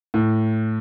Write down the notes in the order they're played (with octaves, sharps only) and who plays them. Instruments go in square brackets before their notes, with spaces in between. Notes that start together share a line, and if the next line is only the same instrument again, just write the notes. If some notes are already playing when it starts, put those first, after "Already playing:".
[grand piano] A2